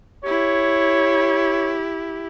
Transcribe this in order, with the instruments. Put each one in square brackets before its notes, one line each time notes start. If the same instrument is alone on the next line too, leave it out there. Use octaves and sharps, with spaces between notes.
[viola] E4 G4 [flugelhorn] C#5